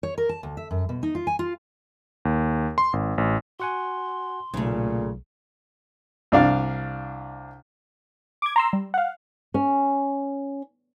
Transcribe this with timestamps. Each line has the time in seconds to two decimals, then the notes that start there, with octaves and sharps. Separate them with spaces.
0.03 C#5
0.18 A#4
0.29 A5
0.43 D2
0.57 E5
0.71 F#2
0.89 B2
1.03 D#4
1.15 F4
1.27 G#5
1.39 F4
2.25 D#2
2.78 C6
2.93 G#1
3.18 A1
3.60 F#4 F#5 G#5 C6
4.54 B1 A#2 C#3 A3
6.32 C2 D4 F5
8.42 D6 G#6
8.56 A#5 C6 E6
8.73 G3
8.94 F5 F#5
9.54 C#4